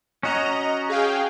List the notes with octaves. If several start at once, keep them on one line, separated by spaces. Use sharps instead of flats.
C#4 F#4 C#5 D#5 A#5
G#4 F5 G5